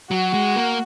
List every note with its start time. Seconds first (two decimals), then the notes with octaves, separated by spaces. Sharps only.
0.11 F#3 F#4
0.34 G#3
0.56 A#3